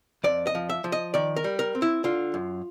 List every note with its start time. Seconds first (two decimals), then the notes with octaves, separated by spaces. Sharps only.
0.24 F2 D5
0.47 D#5
0.55 F3
0.69 E5
0.84 F3
0.92 D#5
1.14 D#3 D5
1.36 A#4
1.44 G3
1.59 A#4
1.75 C4
1.82 E4
2.04 D3 F4
2.34 F#2